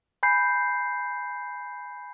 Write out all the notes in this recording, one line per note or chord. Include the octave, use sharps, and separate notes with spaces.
G#5 B5 G6 C7